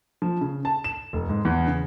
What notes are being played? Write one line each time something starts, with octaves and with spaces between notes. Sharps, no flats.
F3
C#3
A5
E7
F1
G#2
E2
C#3